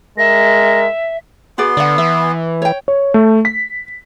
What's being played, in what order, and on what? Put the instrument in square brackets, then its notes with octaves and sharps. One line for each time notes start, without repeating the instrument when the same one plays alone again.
[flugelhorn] G#3 [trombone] A#4 [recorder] E5 [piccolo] A#6
[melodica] B3 C6 [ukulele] F#4 G#4 D5
[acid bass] D3 [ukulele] D5 F#5
[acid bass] E3 [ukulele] E5
[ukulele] C#5 G5
[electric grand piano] C#5
A3
B6